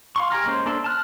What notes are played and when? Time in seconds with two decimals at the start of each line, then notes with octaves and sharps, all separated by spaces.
0.16 F5 C6 C#6
0.30 G4 G#5 A#5 F6
0.45 G#3 A#3 C#4 C5
0.66 A#3 D4 A4 C5 E5
0.84 A5 F6 F#6